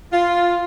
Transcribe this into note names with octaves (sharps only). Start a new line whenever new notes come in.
F4